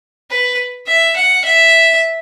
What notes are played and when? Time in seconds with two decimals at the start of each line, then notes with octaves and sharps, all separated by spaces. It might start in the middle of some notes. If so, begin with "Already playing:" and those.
0.30 B4
0.87 E5
1.16 F#5
1.45 E5